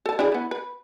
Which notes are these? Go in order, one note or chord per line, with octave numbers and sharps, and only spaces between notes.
A4 A5
D4 E4 G#4
E3 B3
B4